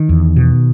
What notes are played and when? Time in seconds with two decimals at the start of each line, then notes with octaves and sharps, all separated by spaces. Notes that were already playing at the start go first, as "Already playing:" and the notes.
Already playing: D#3
0.09 E2
0.36 B2